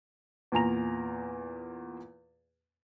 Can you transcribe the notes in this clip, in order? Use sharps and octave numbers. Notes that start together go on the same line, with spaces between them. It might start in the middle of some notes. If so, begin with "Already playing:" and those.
E2 A#2 G#5 A#5 F7